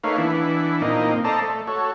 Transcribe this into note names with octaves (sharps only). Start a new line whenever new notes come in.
A3 A#3 D#4 B4 C#5 F5
E3 B3 D4 E4
A#2 A#3 C4 D#4 D#5
A4 C5 D5 D#5 A5 A#5
A3
F#4 A4 C#5